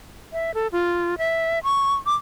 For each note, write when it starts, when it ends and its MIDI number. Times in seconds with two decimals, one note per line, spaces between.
0.33 0.54 76
0.54 0.67 69
0.72 1.18 65
1.18 1.59 76
1.64 1.94 85
2.06 2.15 86